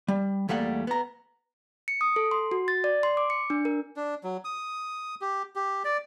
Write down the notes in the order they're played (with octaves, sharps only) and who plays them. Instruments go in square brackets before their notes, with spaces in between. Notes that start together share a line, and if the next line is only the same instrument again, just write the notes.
[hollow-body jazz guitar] G3
E2 G3 A3 A#3 F#5
B3 A#5
[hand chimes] C#7
D#6
A4
C6
F#4
A6
D5
C6
D6
C#7
D4
A#4
[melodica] D4
F#3
D#6
G4
G4
D5